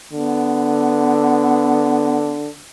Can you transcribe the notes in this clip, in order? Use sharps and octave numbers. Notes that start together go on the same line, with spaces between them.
D3 B3